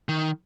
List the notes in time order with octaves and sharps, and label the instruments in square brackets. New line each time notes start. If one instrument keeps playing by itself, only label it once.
[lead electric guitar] D#3